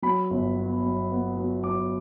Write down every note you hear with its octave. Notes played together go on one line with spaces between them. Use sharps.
F#3 B5
G1
B3
F#3
B3
F#3
F#3 D6